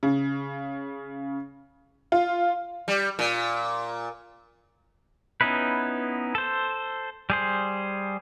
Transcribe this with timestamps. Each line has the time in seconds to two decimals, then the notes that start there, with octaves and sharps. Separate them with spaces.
0.03 C#3
2.12 F4
2.88 G3
3.19 A#2
5.41 B3 C#4 D#4 E4 B4
6.35 A4 C5
7.30 G3 G#4 C5